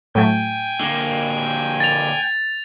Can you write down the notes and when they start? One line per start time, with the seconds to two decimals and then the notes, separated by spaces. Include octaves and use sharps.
0.15 A2 F#3 A3 G5 G#5
0.81 D3 A#3
1.80 A6 F7